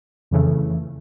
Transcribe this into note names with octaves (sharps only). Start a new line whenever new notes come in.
F2 C#3 E3 A3